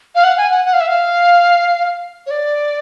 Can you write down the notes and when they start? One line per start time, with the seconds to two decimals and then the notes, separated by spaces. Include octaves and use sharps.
0.15 F5
0.24 F#5
0.37 G#5
0.51 F#5
0.65 F#5
0.73 F5
0.81 E5
0.88 F5
2.27 C#5
2.31 D5